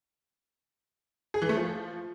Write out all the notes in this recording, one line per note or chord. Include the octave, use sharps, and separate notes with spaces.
G#4
E3
A3
F3